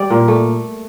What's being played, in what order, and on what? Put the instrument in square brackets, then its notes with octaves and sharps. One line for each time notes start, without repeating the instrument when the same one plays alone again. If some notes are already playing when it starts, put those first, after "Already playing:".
Already playing: [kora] G3 D5
A#2
A3